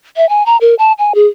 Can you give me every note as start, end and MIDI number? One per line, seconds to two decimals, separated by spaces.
0.17 0.28 76
0.29 0.45 80
0.46 0.57 82
0.61 0.75 70
0.79 0.92 81
0.99 1.13 80
1.15 1.27 68